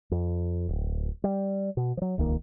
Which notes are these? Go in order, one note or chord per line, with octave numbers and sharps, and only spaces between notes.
F2
D1
G3
B2
F3 F#3
D#1 C#2 D#3 A#3